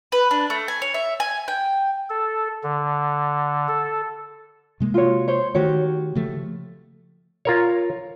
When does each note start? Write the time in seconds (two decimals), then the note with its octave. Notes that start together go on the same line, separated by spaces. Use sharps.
0.12 B4
0.31 D4
0.50 A3
0.68 G#5
0.82 C#5
0.94 E5
1.20 G#5
1.48 G5
2.10 A4
2.63 D3
3.68 A4
4.80 C3 G#3 A#3
4.94 F4 F#4 C#5
5.28 C5 C#5
5.55 D#3 A3 F#4 G4 C#5
6.15 C#3 F3 A3
7.45 F4 A#4 C#5